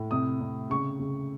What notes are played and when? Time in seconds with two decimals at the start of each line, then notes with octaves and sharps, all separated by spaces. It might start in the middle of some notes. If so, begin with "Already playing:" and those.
Already playing: A2
0.11 C3 D#6
0.41 C3
0.70 C#3 C#6
0.99 C#3